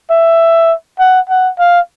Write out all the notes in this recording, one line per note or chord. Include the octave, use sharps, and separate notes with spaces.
E5
F#5
F#5
F5